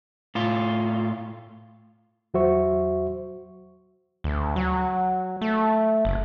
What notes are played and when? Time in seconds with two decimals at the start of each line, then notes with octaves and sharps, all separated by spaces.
0.35 A2 F4
2.34 E2 F#3 F#4 C5 E5 C#6
4.24 D2
4.56 F#3
5.41 A3
6.05 F#1